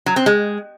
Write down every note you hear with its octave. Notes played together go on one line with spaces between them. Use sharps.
F#3
C4
G#3